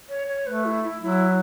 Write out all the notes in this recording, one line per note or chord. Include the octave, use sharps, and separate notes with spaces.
C#5
C#5
A3 B4
E4
E4
F#3 E4